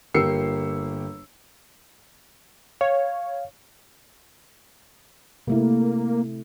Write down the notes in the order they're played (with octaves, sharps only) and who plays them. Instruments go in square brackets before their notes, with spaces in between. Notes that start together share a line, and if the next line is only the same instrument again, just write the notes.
[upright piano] G1 A#3 G4 E6 C7 C#7
[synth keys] C#5 [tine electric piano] F5
[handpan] C3 A3 E4 [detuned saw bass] A#3